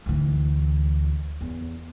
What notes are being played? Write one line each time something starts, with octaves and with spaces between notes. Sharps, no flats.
D2 E3
E2